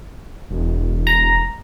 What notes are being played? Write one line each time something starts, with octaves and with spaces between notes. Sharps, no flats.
E1
A#5